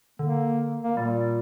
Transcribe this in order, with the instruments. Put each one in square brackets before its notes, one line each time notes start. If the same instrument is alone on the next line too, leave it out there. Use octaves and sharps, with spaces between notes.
[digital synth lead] D3 [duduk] A#3
[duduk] A#3
[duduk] A#2 [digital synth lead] G3